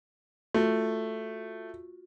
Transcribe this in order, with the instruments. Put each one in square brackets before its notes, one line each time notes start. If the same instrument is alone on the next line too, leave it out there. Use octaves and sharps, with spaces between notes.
[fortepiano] A3 [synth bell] F4 F#4